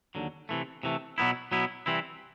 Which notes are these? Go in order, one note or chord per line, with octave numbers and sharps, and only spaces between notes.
D#2 D3 F#3
C3 E3 A3
C3 E3 A3
B2 F#3 B3 E4
B2 F#3 B3 E4
C3 E3 G3 C4 E4